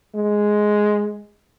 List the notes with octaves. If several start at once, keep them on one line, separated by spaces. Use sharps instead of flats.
G#3